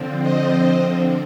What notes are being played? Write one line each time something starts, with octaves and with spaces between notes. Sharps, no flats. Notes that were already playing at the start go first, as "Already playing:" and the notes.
Already playing: D3 F3 C4
C5 D#5